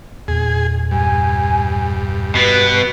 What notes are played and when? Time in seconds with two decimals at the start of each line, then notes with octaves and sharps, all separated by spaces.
0.28 E2 A#2 G#4
0.91 G2 G#5
2.35 B2 B3 B4